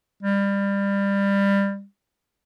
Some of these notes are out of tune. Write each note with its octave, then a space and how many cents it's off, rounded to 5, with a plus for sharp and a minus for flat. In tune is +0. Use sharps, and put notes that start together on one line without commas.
G3 +25